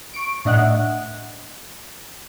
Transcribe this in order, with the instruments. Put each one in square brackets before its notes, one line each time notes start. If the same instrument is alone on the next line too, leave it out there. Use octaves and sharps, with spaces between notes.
[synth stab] C#6 D7
A2 D4 D#5 E5 F#5 F#6